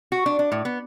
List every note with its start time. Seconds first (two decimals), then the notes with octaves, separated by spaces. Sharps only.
0.12 F#4
0.26 D4
0.39 D4
0.52 A2
0.65 B3